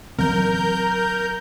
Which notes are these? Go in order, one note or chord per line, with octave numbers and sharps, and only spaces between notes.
E3 F#3 C4 A#4 G6